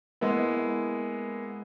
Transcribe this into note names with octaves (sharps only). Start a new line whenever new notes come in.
G#3 A#3 B3 E4